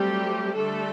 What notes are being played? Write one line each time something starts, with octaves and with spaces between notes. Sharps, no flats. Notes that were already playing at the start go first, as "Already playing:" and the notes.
Already playing: F#3 G3 A3 C4 G4
D3 G3 A3 D4 A4